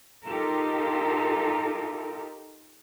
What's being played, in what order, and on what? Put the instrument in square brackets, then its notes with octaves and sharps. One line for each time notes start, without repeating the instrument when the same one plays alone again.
[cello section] D#4 F4 G4 A4 A#4